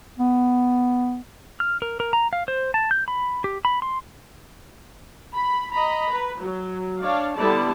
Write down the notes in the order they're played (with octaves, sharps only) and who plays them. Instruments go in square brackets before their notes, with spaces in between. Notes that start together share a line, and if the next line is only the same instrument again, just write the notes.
[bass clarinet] B3
[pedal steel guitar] F6
A#4
A#4
A#5
F5
C5
A5
G6
B5
G4
B5
C6
[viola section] B5
D#5 A#5 B5
B4
F#3
D4 C#5 D5 F5
D3 G3 B3 E4 D5 A5